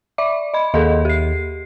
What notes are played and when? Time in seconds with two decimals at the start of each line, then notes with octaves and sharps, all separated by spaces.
0.18 D5 E5 D6
0.54 D#5 B5
0.74 D#2 G#4 A4 D#5
1.05 G4 C7